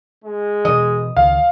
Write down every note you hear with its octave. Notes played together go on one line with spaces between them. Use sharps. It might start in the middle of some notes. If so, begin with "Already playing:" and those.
G#3
B2 E3 D#5
C#2 D#3 F5